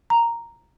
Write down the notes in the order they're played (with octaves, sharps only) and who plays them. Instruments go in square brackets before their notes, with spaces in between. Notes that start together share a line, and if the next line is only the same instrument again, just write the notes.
[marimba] A#5